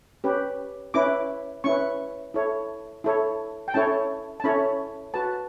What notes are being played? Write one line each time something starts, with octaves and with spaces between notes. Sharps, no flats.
C#4 G4 B4
C#4 E4 B4 D6
C#4 E4 B4 C#6
E4 A4 C#5
E4 A4 C#5
G5
C#4 E4 A4 C#5 A5
A5
C#4 E4 A4 C#5 B5
F#4 B4 A5